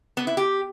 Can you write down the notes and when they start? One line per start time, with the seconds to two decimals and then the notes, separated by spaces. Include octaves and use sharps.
0.17 B3
0.27 E4
0.37 G4